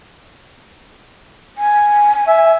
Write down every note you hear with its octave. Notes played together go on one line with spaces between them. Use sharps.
G#5
E5